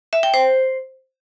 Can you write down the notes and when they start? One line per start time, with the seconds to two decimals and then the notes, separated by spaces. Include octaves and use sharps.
0.13 E5
0.23 G5
0.34 C5